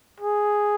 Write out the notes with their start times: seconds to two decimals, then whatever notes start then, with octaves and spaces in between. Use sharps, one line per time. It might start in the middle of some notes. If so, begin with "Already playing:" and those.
0.21 G#4